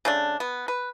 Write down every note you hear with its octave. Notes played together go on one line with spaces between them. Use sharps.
C#3 A3 D4
B3
B4